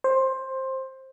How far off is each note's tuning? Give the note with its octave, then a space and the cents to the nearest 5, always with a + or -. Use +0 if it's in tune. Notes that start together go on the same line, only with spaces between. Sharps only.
C5 +15